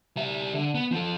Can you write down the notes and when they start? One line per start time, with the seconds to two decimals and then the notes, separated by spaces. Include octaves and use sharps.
0.17 G3 E5
0.54 D3
0.75 B3
0.92 F3 A4